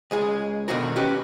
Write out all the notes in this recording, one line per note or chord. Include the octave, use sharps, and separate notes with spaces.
C#2 G#3 G#4
B2 D3 D#3 D4 F#4 A#4
C#4 F#4 G4 B4